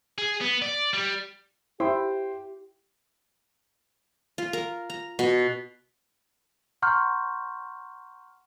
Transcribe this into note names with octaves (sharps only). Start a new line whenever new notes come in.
G#4
B3
D5
G3
E4 G4 C5 G5 C6
F4
A#4
A#5
B2
F#5 A#5 C6 C#6 F6 G6